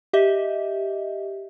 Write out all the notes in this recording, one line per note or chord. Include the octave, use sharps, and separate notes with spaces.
G4 D#5 E5